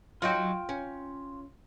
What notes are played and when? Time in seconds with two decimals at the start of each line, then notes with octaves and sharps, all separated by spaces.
0.22 F#3 D#4 F4 F#4 G5
0.69 C#4